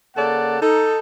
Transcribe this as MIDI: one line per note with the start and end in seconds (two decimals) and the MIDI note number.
0.15 0.57 49
0.15 0.57 58
0.15 0.57 69
0.15 0.57 74
0.15 0.57 78
0.61 0.99 63
0.61 0.99 69